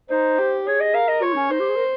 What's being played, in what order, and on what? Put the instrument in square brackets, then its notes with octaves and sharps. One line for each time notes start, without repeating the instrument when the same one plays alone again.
[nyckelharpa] D#4 [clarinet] C5
[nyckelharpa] G4
[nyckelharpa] G#4 [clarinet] C#5
[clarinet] D#5
[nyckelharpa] A#4 [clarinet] F5
[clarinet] D#5
[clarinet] F4 [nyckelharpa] C#5
[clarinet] D#4
C#4
[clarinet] D#4 [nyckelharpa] C5
[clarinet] G4
G#4
A#4